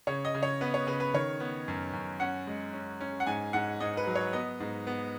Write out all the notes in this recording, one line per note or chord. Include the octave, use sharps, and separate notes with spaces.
C#3 C#5
D#5
C#3
C#5
B3 B4
C#5
C#3 B4
B4
D#3 C#5
B3
F#2
F#2
C#4 F#5
G#3
C#4
C#4
F#5
G#2 G#5
G#2 F#5
G#2 D#5
B4
F#3
C#5
B3 D#5
G#2
B3